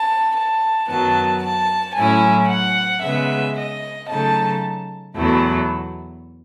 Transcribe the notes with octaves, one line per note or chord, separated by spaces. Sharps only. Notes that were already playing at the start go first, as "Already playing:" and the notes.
Already playing: A5
A5
F#2 D#3 F#3 B3 A5
A5
A2 F#3 C#4 E4 G#5
F#5
C#3 G#3 B3 E5
D#5
C#3 F#3 A3 D#4 A5
E2 B2 F#3 A3 E4